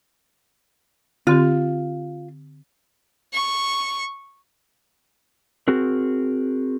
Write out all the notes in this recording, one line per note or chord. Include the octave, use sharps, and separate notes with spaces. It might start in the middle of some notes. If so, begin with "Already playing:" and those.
D3 C4 F4 G4
C#6
C4 F#4 G#4 A#4